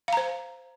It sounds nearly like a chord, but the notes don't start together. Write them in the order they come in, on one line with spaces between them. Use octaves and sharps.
F5 A#5 C5